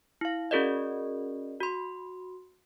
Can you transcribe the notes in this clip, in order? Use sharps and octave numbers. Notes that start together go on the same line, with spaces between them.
E4 F5
C#4 F#4 G#4 A#4 D5 D#5
F#4 C6